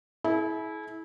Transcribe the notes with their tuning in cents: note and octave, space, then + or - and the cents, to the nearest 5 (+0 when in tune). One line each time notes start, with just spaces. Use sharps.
E4 -20 G#4 +45